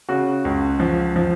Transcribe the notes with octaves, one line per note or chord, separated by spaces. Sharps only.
C#3 F#4
C#2
F3
F3